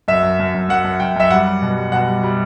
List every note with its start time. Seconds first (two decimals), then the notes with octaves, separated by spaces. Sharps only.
0.08 F#2 E5
0.23 F#2
0.40 F#2
0.54 F#2
0.69 F#2 F#5
0.85 F#2
1.00 F#2 G5
1.16 F#2 E5
1.31 G3 F#5
1.46 G3
1.62 B2
1.77 G3
1.92 B2 F#5
2.08 G3
2.23 G3